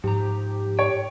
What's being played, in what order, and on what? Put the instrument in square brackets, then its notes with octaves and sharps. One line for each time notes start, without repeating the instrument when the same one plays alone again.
[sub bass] G#2 [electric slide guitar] F3 A#5 [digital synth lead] G4
[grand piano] C#5 [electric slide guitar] G5